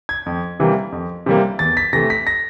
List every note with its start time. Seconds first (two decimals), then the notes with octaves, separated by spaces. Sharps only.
0.09 G#6
0.26 F2
0.60 C3 E3 G3 A#3
0.92 F2
1.26 C3 E3 G3 A#3
1.59 E2 A6
1.77 B6
1.93 C3 E3 A3 A#6
2.10 B6
2.27 A#6